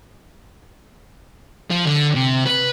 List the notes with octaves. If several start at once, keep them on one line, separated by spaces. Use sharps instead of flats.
F3
D3
C3
B4